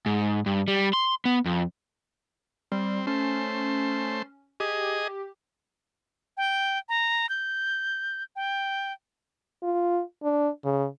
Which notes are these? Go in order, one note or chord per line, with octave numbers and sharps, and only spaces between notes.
G#2
G2
G3
C6
B3
F2
G3 C4
A3 C#4 C5
G4 G#4 D#5
G5
A#5
G6
G5
F4
D4
C#3